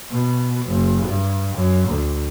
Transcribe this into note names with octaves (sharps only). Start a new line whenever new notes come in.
B2
F#1
G2
F#2
D2